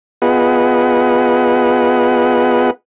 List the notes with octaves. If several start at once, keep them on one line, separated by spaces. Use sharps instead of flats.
B3 F4 G#4 B4 D#5 F#5